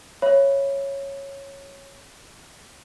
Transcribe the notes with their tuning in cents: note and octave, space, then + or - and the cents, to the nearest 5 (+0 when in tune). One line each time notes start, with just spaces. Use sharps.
C#5 -10 E5 +35 B5 +0